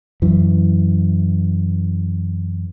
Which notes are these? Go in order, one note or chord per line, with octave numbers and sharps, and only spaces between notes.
F#2 E3